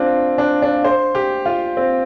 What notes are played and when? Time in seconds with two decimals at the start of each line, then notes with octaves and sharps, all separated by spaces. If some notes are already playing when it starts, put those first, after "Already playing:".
Already playing: C4 D4 F4
0.38 D4
0.62 D4
0.84 C5
1.15 G4
1.46 F4
1.77 C4